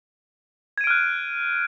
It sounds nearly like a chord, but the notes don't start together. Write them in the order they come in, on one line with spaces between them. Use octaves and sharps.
G#6 D#7 D7 F6 F#6